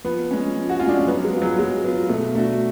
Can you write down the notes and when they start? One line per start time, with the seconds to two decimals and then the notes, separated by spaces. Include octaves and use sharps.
0.04 F3 B3
0.31 G#3 C#4
0.56 F3
0.70 F#4
0.80 C#4 F4
0.86 G#3 D4
0.98 C#4
1.07 F#3 B3
1.24 G#3
1.33 B3 F4
1.42 F#3
1.59 F#3 G#3
1.84 B3 F4
2.09 B2 A3
2.35 A3 D4 F#4